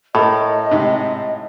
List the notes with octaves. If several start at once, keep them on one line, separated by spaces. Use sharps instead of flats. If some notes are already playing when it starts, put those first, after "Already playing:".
A2 A4 A#4 D#5
G#2 C3